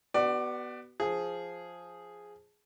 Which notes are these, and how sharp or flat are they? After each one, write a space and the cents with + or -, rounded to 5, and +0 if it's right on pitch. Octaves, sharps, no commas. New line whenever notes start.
B3 +0 F#4 +40 D5 +20
F3 +0 G#4 +0